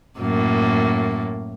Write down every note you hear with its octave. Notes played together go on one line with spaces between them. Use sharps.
F#2 A2 A#3